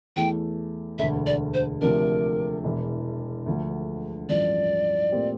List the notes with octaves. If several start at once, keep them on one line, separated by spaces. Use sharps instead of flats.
E2 E3 A3 G5
E1 D2 D3 E5
D5
C5
D2 C3 F3 A3 D4 A#4
E1 E2 E3
D2 D3 F3 A3
A1 G2 F3 D5
A#2 A3 C4 G4 A#4